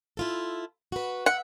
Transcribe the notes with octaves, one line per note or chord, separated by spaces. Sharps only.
E4 F4 A4
F#4 B4
E5 F#5